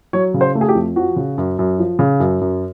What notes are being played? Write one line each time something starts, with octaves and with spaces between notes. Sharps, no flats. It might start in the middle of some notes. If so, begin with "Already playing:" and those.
F#3 C#5
C#3
C5
A3
G#4
G4
F2
F3 F#4
C#3
F#2
F#2
F3
C#3
F#2
F#2